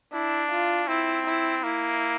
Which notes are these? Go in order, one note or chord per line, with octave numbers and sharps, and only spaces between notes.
D4 E4
F4
C4 E4
E4
A#3 E4